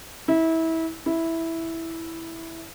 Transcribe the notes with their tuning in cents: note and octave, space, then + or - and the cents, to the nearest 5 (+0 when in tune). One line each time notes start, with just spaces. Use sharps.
E4 -25
E4 -5